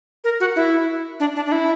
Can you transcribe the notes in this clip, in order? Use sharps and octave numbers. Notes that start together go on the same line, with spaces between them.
A#4
F#4
E4
D4
D4
D4
E4